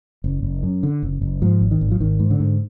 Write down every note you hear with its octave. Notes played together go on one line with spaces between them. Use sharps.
F#1
F#1
F#2
D3
F#1
F#1
G#2 F3
G#1
D#3
G#1
F3
G#1 D#3
G#2
D3
G#2